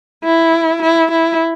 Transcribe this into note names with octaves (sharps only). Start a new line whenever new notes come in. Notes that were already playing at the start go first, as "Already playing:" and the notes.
E4
E4
E4